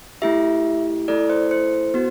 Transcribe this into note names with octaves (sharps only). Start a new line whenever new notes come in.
A3 E4 G4 E5
A3 E4 A4 D5
C5
C5
B3 F#4